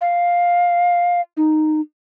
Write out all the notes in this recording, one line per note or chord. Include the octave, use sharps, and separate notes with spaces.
F5
D#4